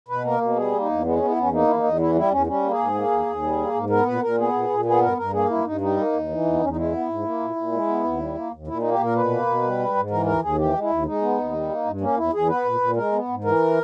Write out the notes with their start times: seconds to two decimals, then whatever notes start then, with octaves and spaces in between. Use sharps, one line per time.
0.08 B2 B4
0.25 A#3 A#4
0.40 B2
0.56 G3 G#4
0.72 A#3
0.80 D#4
0.88 E2
1.04 G#3 B3
1.16 B3 C#4
1.28 E4
1.36 E2 C#4
1.52 A#3 D#4
1.67 E2 E4
1.76 D#4
1.83 E2
1.99 E3 E4
2.15 G3 E4
2.31 E2 C#4
2.47 G3 C#4
2.63 A#3
2.71 G#4
2.79 G#2
2.94 A#3
3.11 D#2
3.26 D#2
3.42 G3
3.59 A#3
3.74 G#2
3.90 B3 A#4
4.06 A#2 B4
4.22 A#2 A#4
4.38 B3 G#4
4.53 A#2
4.69 A#2
4.85 B3 G#4
5.01 G2 A#4
5.17 G2 A#4
5.33 A#3 G#4
5.49 G2 E4
5.65 G2 D#4
5.81 G3 D#4
5.97 A#3
6.13 D#2
6.29 E3
6.45 E2
6.53 B3
6.60 E2 C#4
6.69 D#4
6.76 G#3 E4
6.92 B3
7.08 G#2
7.24 A#3
7.40 A#2
7.56 A#2
7.72 G#3
7.87 B3
8.04 D#2
8.19 G3
8.35 A#3
8.52 D#2
8.67 A#2 E4
8.79 A#3 D#4
8.91 G4
8.99 A#2 A#4
9.15 B2 B4
9.30 A#3
9.46 B2
9.63 G3
9.79 G#2
9.94 G#2
10.10 E3 A#4
10.26 D#2 A#4
10.42 D#2 G#4
10.58 E3 G4
10.74 G#3
10.82 E4
10.90 D#2
11.05 G#3 D#4
11.22 B3
11.38 D#2
11.53 G3
11.69 A#3
11.85 G2
12.01 A#3 C#4
12.17 E2 E4
12.33 E2 G#4
12.48 B3 B4
12.65 A#2
12.81 A#2
12.96 G#3 A#4
13.12 B3
13.28 G#2
13.44 E3 A#4